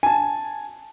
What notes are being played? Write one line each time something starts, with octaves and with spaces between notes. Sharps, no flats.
G#5 A5